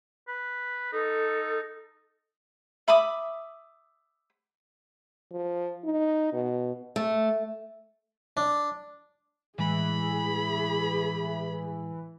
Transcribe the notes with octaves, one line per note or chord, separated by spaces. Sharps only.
B4
D#4 A4
E5 B5 D6 D#6
F3
D#4
B2
A3
D4
A2 E3 G#3 G#4 B5